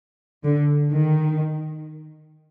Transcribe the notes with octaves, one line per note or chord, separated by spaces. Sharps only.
D3
D#3